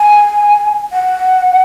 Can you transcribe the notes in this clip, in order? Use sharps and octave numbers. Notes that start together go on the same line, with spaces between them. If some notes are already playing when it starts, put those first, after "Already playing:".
Already playing: G#5
F#5